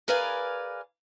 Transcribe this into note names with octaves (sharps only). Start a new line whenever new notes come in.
G#4 A#4 B4 D5 F5 G#5